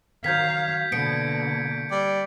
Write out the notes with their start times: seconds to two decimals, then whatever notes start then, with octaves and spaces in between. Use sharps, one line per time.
0.24 D#3 F#3 F5 G6 G#6 B6
0.92 B2 D3 A#3 C#7 D7
1.91 G3 D5